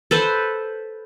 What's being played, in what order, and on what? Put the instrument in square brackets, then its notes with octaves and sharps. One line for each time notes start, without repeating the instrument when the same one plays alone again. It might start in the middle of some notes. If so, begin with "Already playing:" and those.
[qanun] A4 B4 C5